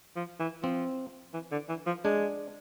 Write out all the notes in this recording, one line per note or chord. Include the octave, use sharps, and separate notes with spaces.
F3
E3
F3 C4
E3
D3
E3
F3
G#3 D4